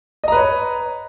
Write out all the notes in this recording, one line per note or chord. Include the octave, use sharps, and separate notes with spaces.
B4 C#5 D#5 A#5